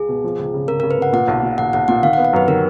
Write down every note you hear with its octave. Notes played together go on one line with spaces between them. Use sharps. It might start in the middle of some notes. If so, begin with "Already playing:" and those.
Already playing: C#2 G#4
B2
F3
C#2
C#3
C#3 A#4
C#3 A#4
B4
C#3 F#5
A#2 F#5
B1
A#2
B1 F#5
B1 F#5
A#2 F#5
D#3 F5
F#5
B3
F#5
F#2 B4
D#3 A#4